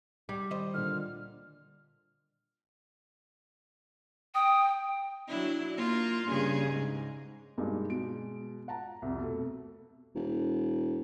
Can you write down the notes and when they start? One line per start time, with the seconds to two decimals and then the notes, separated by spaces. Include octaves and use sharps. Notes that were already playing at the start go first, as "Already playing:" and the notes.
0.29 G3 D6
0.51 D#3 C5 D#5
0.74 A#2 D3 F6
4.34 G5 D#6
5.28 F#3 D4 E4
5.75 A#3 F4
6.29 G2 C#3 G#4
6.68 G#2
7.58 G2 B2 G#3 A#3 D#4
7.90 B2 G#3 D7
8.68 F#5 A5 A#5
9.02 C2 F2
9.20 B2 A3
10.15 E1